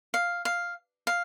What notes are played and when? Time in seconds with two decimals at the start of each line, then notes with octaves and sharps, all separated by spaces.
0.14 F5
0.45 F5
1.07 F5